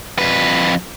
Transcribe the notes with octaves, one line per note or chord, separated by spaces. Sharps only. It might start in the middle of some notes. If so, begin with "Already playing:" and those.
F2 B4